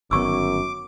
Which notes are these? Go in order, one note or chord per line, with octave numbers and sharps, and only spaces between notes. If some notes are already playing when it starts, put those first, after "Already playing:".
G1 F#2 D#3 B3 C#6 D6 E6